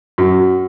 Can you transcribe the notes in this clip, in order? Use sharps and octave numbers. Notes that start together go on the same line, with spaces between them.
F#2